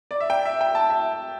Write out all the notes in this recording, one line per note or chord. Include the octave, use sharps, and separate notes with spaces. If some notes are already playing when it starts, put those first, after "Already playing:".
D5
E5
G5
E5
G5
A5
E5